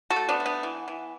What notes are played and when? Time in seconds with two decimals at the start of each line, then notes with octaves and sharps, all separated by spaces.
0.10 F#4 A4
0.16 A3
0.29 B3 D4
0.40 A3
0.46 B3
0.63 E3
0.88 E3